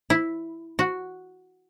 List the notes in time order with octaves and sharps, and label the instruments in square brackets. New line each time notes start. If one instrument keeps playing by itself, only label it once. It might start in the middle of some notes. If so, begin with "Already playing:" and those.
[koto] E4
F#4